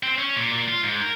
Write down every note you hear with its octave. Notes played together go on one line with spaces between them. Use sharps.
C4
C#4
A#2
A#2
F4
G#2
A#4